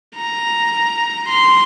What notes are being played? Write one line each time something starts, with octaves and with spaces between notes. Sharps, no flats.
A#5
C6